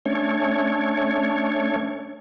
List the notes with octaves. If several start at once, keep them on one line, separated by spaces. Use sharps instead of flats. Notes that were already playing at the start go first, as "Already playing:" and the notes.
A3 C#4 D4 C#5